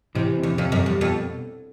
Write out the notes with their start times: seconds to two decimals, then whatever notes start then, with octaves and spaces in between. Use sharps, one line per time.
0.15 C3 E3
0.36 C3
0.43 E2
0.58 F2 C3
0.72 F#2
0.79 G3
0.86 E2
1.00 F2 B2